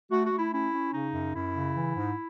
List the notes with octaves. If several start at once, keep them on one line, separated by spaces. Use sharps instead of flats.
A3 F#4
F#4
A3
E4
C#4 E4
C#4
C#3 D#4
F#2
F#2 E4
C#3
E3
G#2